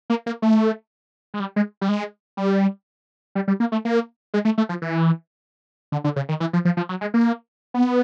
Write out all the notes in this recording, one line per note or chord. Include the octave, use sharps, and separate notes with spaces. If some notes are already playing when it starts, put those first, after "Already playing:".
A#3
A#3
A3
G#3
G3
G#3
G3
G#3
G3
G3
G3
A#3
A3
A#3
G#3
A3
A3
F3
E3
D3
D3
C#3
D#3
E3
F3
F3
F3
F#3
G#3
A#3
B3